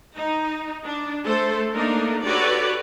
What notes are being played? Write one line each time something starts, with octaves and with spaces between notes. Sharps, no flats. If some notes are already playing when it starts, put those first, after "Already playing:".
D#4
D4
A3 A4 C5
A3 A#3 D4 D#4 A4 A#4
F#4 G4 A4 B4 C#5 D5